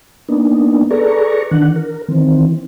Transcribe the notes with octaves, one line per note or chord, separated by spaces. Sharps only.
A#3 B3 D4 D#4
G#4 A4 B4 D5 A#5 C#6
D#3 E3 D4 F#5
A#4
D#3 E3 C4